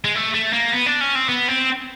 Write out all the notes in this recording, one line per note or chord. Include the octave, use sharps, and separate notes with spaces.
G#3
A3
A3
A#3
B3
D4
C#4
C4
B3
C4